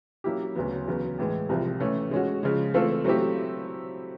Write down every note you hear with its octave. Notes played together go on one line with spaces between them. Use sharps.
F#3 A#3 C#4 E4 G4
D2 C#3 F#3 B3
E2 C#3 F#3 B3
A2 E3 G#3
C2 C3 F3
E3 A3 C#4
G#3 C#4 F#4
C#3 F3 G#3
E3 A3 C4 F4 A4
F#3 A3 C4 E4 G4